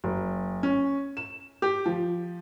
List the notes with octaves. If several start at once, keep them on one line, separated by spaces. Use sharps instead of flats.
F#1
C#4
E7
G4
F3